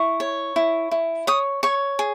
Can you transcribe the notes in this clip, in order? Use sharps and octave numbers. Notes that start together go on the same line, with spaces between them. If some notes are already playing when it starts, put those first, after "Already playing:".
Already playing: E4 C#6
C#5
E4
E4
C#5 D#6
C#5 C#6
G#4